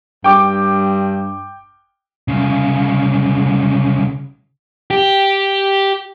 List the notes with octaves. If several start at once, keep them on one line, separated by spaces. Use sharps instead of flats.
G2 G5 D6
C2 C#3
G4